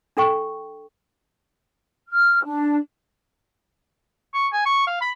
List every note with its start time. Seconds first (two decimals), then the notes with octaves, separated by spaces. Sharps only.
0.17 D4 A4 G5 C#6
2.08 F6
2.44 D4
4.34 C#6
4.53 G#5
4.66 C#6
4.87 F5
5.01 B5